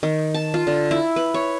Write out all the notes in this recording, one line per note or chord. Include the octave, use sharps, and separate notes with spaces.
D#3
A5
F4
D3
E4
B4
C#5